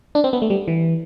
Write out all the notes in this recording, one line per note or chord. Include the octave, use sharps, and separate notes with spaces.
D4
C4
B3
A3
G3
E3